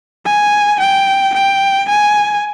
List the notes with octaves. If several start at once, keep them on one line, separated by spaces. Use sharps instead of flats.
G#5
G5
G5
G#5